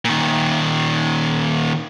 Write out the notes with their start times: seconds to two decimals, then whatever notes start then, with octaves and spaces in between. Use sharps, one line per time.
0.05 A#2 D#3